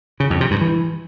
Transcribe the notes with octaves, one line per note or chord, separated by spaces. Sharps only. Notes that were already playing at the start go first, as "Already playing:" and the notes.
C#3
F2
C3
G2
E3